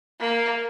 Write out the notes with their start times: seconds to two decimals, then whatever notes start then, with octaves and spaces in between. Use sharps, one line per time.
0.20 A#3